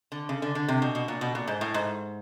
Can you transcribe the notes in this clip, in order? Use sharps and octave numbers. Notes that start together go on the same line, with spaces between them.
D3
C#3
D3
D3
C3
B2
B2
A#2
B2
A#2
G#2
A2
G#2